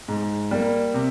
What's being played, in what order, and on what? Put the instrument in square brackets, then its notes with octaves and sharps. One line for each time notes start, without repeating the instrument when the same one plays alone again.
[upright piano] G#2
G3 A#3
C3